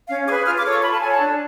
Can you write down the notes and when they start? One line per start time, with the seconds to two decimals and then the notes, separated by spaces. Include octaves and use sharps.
0.09 C#4 F5
0.27 G#4 B4 D6
0.46 F4 F6
0.58 D6
0.64 A4 C#5
0.71 C#6
0.82 F4 B5
0.92 A5
1.01 A4 C#5 G#5
1.10 A5
1.18 D4